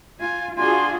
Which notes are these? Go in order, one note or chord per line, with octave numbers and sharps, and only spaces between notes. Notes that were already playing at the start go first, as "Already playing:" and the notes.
F4 G#5
D4 F4 F#4 G#4 G#5 C6